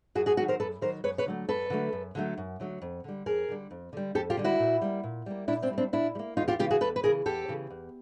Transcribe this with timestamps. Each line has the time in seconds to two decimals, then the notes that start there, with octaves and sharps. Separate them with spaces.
0.15 F#2 F#4 G#4
0.26 F#4 G#4
0.37 D#3 F#4 G#4
0.40 F#3
0.48 A#4 C5
0.60 F#2 A4 B4
0.81 D#3 F#3 A#4 C5
1.04 F#2 B4 C#5
1.18 B4 C#5
1.26 D3 F#3 A3
1.48 F#2 A4 B4
1.70 D3 F#3 A3
1.93 F#2
2.15 D3 F#3 A3
2.38 F#2
2.60 D3 F#3 A3
2.82 F2
3.04 D3 G3
3.26 F2 G#4 A#4
3.49 D3 G3
3.71 F2
3.93 D3 G3
4.15 F2 G4 A4
4.30 F4 G4
4.37 D3 G3
4.44 E4 F#4
4.59 A#2
4.82 G3 A#3
5.04 A#2
5.26 G3 A#3
5.48 A#2 D4 E4
5.62 C4 D4
5.70 G3 A#3
5.78 C4 D4
5.93 A#2 D4 E4
6.15 G3
6.19 A#3
6.37 E2 D#4 F4
6.48 F4 G4
6.59 C#3 E3 F4 G4
6.71 F#4 G#4
6.81 E2 A4 B4
6.96 B4
7.03 C#3 E3 G#4 A#4
7.26 E2 G4 A4
7.48 C#3 E3
7.70 E2